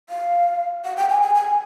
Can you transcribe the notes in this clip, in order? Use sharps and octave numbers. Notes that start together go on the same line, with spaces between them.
F5
F#5
G5
G#5
G#5
G#5